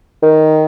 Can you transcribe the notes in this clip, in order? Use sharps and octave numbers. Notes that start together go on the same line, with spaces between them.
D#3